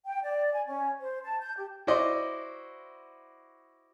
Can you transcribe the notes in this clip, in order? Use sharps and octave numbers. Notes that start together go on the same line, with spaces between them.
G5
D5
G#5
C#4
C5
A5
G6
G4
E4 F#4 C5 D5 D#5 C6